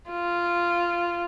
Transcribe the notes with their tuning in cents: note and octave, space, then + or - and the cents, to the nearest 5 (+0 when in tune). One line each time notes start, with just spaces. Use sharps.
F4 -10